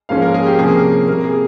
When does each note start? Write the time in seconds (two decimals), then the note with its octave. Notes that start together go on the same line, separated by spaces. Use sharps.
0.09 G#2 F3 A#3 C#4 F5
0.22 A#4
0.34 G#4
0.47 G4
0.59 C3 F3 A#3 C#4 G#4
0.75 A#4
1.08 C3 G3 A#3 A#4
1.24 G#4